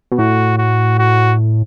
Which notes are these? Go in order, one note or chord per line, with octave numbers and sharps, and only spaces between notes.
B2
A2 F#4
F#4
F#4